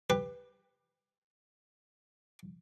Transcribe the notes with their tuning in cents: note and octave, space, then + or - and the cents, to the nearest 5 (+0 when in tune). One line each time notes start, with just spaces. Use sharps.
G4 +20 B4 +0